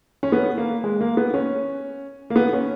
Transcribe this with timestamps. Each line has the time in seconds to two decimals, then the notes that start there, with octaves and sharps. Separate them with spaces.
0.23 C#4
0.32 B3
0.57 A#3
0.84 G#3
1.01 A#3
1.17 B3
1.34 C#4
2.30 A#3
2.36 B3
2.53 C#4